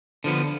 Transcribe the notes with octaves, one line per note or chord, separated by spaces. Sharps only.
D3 F3 B3